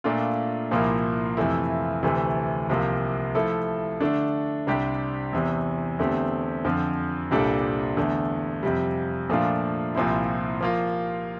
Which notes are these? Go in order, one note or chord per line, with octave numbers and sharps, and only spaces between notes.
A#2 A3 D4 F4
C2 A#2 F3 A#3 E4
F2 C3 E3 A3 E4
D2 C3 E3 A3
C2 C3 F3 A#3
F3 A3 E4 A4
D3 A3 D4
C2 C3 G3 D4 G4
E2 C3 E3
E2 D3 A3 C4 G4
F2 D3 F3
C2 A#2 G3 D4 A4
E2 D3 A3
F2 C3 G3
A#2 F3 A3 D4 F4
C2 A#2 F3 C4 E4
F3 A#3 F4